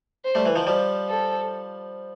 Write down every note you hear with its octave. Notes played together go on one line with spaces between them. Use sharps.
C5
G3 A3
E3
D#3 F3
F3 G3
A4